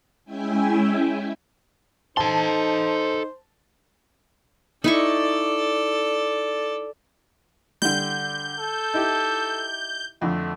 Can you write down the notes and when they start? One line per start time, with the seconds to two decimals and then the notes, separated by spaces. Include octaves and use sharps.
0.25 G#3 C#4 E4 E5 G5 G#5
2.17 D#4 A4 C5 A5 C6
4.84 D#4 E4 A4 D5 C#6
7.82 D3 G3 G6
8.59 A4
8.94 D#4 E4 G4
10.22 F2 D3 F3 A3